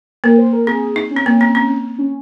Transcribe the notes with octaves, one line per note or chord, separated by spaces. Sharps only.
A#3 A#4
C5
A#4
C4 G#4
D#4
C#4
C4
A#3
C4
C4
C#4